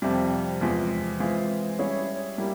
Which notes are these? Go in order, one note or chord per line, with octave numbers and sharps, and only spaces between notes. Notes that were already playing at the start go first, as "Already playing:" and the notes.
F2 C3 G3
E2 C3 F3 G#3
E3 G#3 C4 F4 C5
G3 C#4 E4 G#4 C#5
G3 A#3 E4 G4